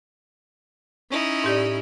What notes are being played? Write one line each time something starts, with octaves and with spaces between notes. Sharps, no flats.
C#4 D#4 E4
A2 G4 D5